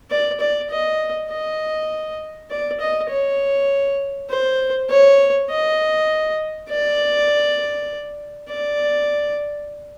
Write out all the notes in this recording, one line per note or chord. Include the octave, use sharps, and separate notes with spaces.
D5
D5
D#5
D#5
D5
D#5
C#5
C5
C#5
D#5
D5
D5